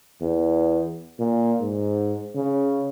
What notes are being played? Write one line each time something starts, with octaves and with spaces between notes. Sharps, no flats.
E2
A#2
G#2
C#3